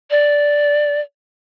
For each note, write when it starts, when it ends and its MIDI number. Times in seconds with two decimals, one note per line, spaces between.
0.11 1.01 74